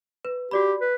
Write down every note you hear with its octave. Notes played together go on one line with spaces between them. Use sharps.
B4
F#4 G4 D5 B5
B4